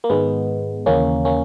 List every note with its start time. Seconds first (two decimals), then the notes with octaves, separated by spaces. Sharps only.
0.04 A#3
0.10 G#2 D#3 G#3 B3
0.86 D#2 C#3 E3 A#3 C#4
1.25 A#3 C#4